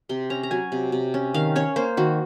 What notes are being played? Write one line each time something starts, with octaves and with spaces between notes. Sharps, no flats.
C3 C6
C#4 A#5
A#5
F#3 G#5
C3
C3
C#4
D#3 F5
C#4 C#5
A#3 C5
D#3 F#4